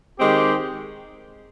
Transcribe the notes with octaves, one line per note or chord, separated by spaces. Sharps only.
D#3 G#3 C4 G4